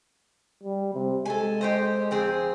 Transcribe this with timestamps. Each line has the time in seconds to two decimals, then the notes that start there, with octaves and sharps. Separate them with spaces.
0.63 G3
0.94 C3
1.25 G#3 A4 G#5
1.61 G4 C5 D#5
2.11 F2 C4 G#4